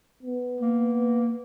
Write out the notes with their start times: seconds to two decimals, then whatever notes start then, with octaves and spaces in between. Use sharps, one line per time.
0.23 B3
0.61 A#3